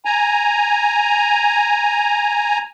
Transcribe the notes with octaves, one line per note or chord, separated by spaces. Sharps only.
G#5 A#5